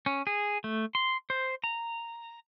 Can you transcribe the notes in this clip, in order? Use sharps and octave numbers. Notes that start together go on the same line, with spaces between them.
C#4
G#4
A3
C6
C5
A#5